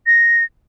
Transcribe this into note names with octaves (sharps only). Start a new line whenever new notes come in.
A#6